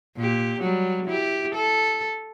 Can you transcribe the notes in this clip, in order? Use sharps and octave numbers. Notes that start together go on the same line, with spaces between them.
A#2 G4
F#3 G3
E4 G4
A4